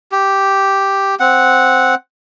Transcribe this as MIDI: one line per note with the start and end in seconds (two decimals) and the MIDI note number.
0.12 1.15 67
1.20 1.95 60
1.20 1.95 78